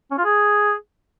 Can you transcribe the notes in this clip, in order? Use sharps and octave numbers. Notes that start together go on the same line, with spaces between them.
C#4
F4
G#4